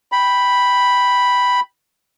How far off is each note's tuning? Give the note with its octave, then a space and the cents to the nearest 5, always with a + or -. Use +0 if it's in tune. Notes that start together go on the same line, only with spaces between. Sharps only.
G5 +0 B5 +0